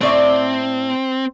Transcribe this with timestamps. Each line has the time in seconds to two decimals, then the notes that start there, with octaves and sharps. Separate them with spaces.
0.01 A2 C4 D5 E5